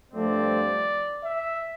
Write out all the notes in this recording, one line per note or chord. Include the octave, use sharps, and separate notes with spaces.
G2 F3 A3 C4 D5
E5